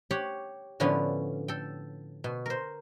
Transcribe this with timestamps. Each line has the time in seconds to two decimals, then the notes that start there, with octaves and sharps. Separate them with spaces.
0.11 G4 C#5 F#5 G5
0.80 A2 D3 F3 B3 C#4
1.48 A4 G5
2.24 B2
2.46 A#4 C5